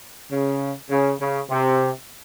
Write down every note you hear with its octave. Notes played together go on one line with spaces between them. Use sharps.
C#3
C#3
C#3
C3